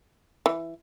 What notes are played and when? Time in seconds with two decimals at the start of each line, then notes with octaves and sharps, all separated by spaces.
0.46 E3